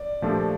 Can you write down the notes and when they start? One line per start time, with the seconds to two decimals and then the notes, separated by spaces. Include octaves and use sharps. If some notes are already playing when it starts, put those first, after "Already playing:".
Already playing: D5
0.22 A#2 F3 A3 D4 G4